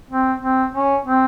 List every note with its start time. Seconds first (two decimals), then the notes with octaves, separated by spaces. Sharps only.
0.11 C4
0.42 C4
0.73 C#4
1.05 C4